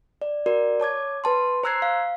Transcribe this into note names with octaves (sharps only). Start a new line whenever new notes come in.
D5
F#4 A#4 D5
C#5 A5 D6 G#6
B4 A5 C6
C5 A#5 E6 F#6 G#6 C7
F5